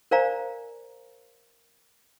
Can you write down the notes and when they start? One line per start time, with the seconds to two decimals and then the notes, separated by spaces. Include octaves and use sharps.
0.11 A#4 C5 D5 F5 G#5 A#5